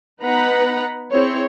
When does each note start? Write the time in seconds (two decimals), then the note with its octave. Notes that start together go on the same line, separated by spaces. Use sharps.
0.22 B3 D#4 B4 F#5 A#5 B5
1.11 C4 E4 G#4 C5 C#5